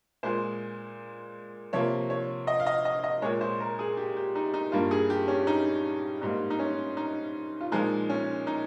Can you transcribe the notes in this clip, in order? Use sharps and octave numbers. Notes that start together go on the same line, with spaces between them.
A#2 G#3 C5
C3 F3 A#3 C#5
C#5
D#5
F5
D#5
D#5
D#5
A#2 G#3 C#5
C5
A#4
G#4
G4
G4
D#4
D#4
G2 G3 A#3 F4
G#4
G4
C#4
D#4
G#2 G3 A#3 D#4
D#4
C#4
D#4
F4
A#2 F3 G#3 D#4
C#4
D#4